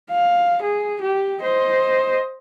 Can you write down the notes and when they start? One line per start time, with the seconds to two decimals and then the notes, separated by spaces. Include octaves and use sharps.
0.11 F5
0.62 G#4
1.01 G4
1.41 C5 D#5